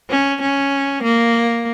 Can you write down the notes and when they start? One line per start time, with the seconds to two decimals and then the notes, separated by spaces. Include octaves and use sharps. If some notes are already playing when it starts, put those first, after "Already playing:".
0.10 C#4
0.42 C#4
1.03 A#3